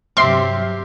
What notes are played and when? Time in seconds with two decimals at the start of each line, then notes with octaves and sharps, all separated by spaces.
0.17 G2 C3 F#3 C4 G4 E5 C6 F6